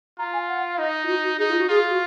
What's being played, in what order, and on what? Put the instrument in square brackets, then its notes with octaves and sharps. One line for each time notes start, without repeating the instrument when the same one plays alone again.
[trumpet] F4 [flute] A#5
[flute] G#5
F#5
F5
[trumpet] D#4 [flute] D#5
[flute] F4
F#4
F#4
[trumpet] D#4 [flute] G#4
[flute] F4
F#4
[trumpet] F4 [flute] G#4
[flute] F#4